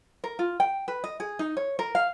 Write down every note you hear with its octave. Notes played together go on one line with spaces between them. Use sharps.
A#4
F4
G5
B4
D#5
G#4
D#4
C#5
A#4
F5